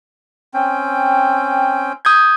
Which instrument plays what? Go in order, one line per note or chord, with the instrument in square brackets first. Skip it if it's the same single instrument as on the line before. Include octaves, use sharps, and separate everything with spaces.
[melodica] C4 C#4 G5
[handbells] D#6 G6 G#6